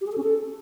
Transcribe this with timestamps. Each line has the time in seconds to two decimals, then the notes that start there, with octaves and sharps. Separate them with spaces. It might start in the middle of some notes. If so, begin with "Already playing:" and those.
0.01 G4
0.07 G#4
0.12 A4
0.18 C#4
0.23 A4